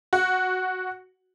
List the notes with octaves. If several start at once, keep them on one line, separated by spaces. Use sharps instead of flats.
F#4